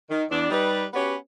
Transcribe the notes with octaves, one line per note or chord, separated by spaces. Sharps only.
D#3
E2 D4
G3 D#4 B4
B3 C#4 F#4 G4 B4 C#5